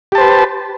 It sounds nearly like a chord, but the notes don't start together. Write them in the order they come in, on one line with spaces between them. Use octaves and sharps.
G4 A5 C5 B4